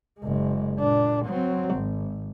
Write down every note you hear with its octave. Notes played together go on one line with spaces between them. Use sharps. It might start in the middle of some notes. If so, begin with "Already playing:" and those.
F#1 G#3
A#2 D4
F#3 C4
G#1